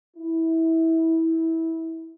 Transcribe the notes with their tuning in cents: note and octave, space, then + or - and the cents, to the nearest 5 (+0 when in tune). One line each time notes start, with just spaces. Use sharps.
E4 -20